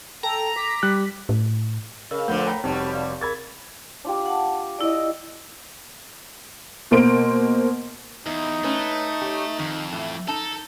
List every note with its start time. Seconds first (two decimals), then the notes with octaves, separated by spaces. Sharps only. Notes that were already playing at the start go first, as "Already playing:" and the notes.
0.23 A4 G5 A#5
0.56 D6 B6
0.83 G3 F#6
1.29 A2
2.11 C#3 A#4 D#5 E6
2.28 F2 A#2 D3 A3 B4 F#5 G6
2.47 C#5 G5 A#5 B5
2.64 F1 B2 G3 C4 D#4 C#5 A5
2.93 D5 F5
3.21 G#4 A#4 B5 G#6 A6
4.04 D4 F4 G4
4.26 F#5 A5
4.79 E4 A4 D5 D#5
6.91 B2 A#3 C5 D7
8.26 E2 D#4
8.64 A3 C#4 B4
9.21 G4 C#5
9.59 F2 D#3
9.93 A2 E3
10.28 D#4 A4 A5 A#5